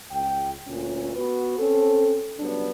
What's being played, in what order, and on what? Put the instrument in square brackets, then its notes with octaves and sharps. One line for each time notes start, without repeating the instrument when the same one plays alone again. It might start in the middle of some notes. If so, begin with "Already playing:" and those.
[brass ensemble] C#2 G5
D2 A#2 C#4
B3 F#4 B4
C4 C#4 A4
C#3 F#3 G3 B3 D4